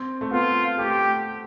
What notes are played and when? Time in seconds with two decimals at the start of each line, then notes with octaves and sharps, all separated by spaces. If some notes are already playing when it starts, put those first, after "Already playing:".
Already playing: C4
0.21 A3
0.31 B3 F4
0.79 A3 G4